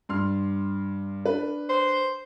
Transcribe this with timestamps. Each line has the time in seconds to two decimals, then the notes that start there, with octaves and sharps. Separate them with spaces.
0.09 G2 C6 F6
1.25 D4 B4
1.69 C5